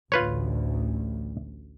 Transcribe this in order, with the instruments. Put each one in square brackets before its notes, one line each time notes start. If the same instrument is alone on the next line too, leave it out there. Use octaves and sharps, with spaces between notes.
[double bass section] A1 D2 [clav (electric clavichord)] F4 B4 C#5